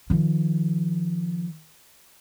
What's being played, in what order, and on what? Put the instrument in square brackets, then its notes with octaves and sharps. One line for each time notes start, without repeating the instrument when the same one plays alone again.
[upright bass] D#3 F3